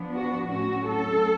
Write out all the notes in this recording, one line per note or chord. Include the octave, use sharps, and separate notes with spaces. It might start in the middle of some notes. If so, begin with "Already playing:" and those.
Already playing: F3 B3 D4
F#4
A2 F#3 C#4 F#4
A4